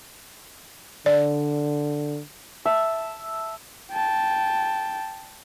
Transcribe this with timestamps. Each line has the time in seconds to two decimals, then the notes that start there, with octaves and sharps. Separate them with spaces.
1.06 D3 D5
2.65 E5 A5
3.92 G5 A5